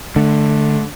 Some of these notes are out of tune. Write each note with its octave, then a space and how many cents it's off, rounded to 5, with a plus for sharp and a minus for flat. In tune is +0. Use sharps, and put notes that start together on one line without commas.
D3 +5 A3 -25